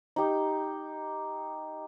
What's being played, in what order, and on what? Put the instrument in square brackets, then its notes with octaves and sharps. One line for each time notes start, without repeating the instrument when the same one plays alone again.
[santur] D#4 G4